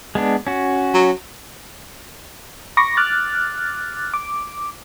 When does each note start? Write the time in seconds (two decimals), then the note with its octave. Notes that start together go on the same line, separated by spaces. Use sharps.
0.15 G#3 B3 D4
0.47 C#4 F#4
0.94 F#3
2.77 B5 C#6 D6 A#6
2.97 D6 F6 F#6 A6
4.14 D6